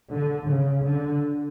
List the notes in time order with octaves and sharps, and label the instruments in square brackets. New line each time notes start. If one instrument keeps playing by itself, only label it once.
[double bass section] D3
C#3
D3